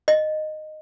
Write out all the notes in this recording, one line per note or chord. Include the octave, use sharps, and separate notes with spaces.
D#5